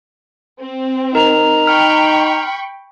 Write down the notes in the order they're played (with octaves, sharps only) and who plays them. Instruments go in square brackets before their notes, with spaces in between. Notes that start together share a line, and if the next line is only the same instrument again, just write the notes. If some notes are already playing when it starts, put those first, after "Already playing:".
[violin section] C4
[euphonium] D#4 [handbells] A#4 [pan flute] A#5
[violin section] G5 B5 C#6 [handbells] F6